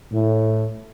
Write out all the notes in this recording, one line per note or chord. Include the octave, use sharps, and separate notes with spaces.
A2